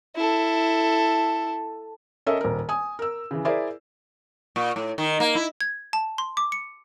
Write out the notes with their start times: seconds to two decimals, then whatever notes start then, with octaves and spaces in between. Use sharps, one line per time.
0.16 E4 A4
2.26 C#4 A4 A#4 D#5 E5
2.41 D#1 A#4
2.69 G#5 D#6
2.99 A#4 E6
3.31 C#3 E3
3.45 E4 G#4 A#4 C5 D5 E5
4.56 A#2
4.76 A2
4.98 D#3
5.20 A#3
5.35 E4
5.61 G#6
5.93 A5
6.18 C6
6.37 D6
6.52 C#7